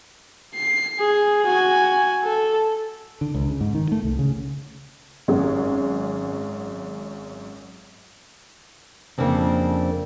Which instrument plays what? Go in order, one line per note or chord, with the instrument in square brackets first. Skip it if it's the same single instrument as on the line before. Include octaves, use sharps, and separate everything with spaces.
[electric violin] C7
G#4
F#4 G#5
A4
[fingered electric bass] D3
C#2
C#3
G#2
D#3
A3
C2
C#3
[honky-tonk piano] G#1 F#2 G#3
[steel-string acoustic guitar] F2 A#2 C#3 A#3 C4 D4